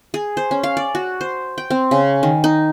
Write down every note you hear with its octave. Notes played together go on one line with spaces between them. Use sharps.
G#4
C5
C#4
F5
D5
F#4
C5
G5
C4
C#3
D#3
D#4